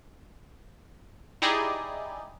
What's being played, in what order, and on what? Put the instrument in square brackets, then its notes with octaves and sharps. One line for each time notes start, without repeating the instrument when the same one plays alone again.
[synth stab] D#4 E4 G4 G#4 D5 D#5